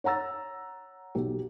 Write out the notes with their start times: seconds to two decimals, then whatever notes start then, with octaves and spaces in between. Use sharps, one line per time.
0.04 C#5 F#5 A#5 E6 A6
1.15 B1 G4